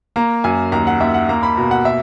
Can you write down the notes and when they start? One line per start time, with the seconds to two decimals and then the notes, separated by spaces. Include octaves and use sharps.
0.16 A#3 A#5
0.44 F#2 G#5
0.72 D#2 A#5
0.87 F#5
1.00 D#2 E5
1.14 F#5
1.29 A#3 A#5
1.43 B5
1.57 B2 A#5
1.71 F#5
1.85 E5